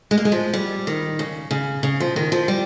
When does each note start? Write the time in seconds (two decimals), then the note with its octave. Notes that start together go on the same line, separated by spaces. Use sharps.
0.11 G#3
0.18 A#3
0.25 G#3
0.32 F3
0.53 G3
0.87 D#3
1.19 C#3
1.51 C#3
1.83 C#3
2.00 F3
2.16 D#3
2.32 F3
2.48 G3